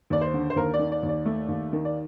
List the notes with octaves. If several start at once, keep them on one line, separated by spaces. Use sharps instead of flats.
D#2 D5
C5
D3
C5
D#2 A#4
D5
D#3
D5
D#2
D5
A3
D#2
D#3
D5